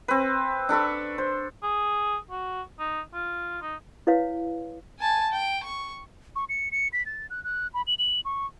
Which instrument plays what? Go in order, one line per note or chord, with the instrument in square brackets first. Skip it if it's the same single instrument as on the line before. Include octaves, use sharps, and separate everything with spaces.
[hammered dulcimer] C4 B4
D4 A4 B5 C#6
C5
[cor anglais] G#4
F#4
D#4
F4
D#4
[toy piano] E4 B4 C#5 F5
[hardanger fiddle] G#5 A5
G5
C#6
[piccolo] C#6
C#7
C#7
B6
A6
F#6
F#6
B5
F#7
F#7
C#6